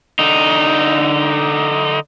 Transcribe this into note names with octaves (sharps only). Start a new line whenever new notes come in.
D3 D#4